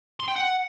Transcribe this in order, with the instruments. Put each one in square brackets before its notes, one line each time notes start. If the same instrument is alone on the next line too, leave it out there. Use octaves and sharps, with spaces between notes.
[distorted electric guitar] C6
G5
F#5